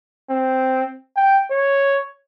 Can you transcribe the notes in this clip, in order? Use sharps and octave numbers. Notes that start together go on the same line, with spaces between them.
C4
G5
C#5